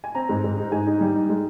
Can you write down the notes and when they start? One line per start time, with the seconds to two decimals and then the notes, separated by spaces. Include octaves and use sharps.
0.04 G#5
0.15 C4 A#5
0.29 G#2
0.44 G#2
0.58 D#4
0.72 G#2 G#5
0.87 D#4
1.01 G3
1.15 D#4
1.29 G#3